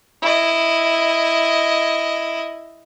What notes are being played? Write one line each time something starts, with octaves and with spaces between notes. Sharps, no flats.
E4 D#5